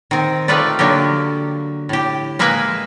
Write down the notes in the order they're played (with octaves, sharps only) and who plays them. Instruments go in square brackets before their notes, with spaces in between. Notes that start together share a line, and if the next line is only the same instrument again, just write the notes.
[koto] D#3 C4
D#3 A3 F4 A4 B4 D5
D3 F#3 A#3 G4
A2 G4
G#3 A#3 B4 E5 G#5